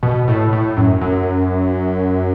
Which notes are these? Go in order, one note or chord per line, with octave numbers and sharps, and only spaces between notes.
B2
A2
A2
F#2
F#2